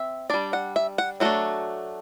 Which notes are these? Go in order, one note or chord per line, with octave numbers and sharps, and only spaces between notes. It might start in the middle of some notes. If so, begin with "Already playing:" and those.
Already playing: C4 E5
G3 D4 D5
F#5
E5
F#5
F#3 A3 D4 F#4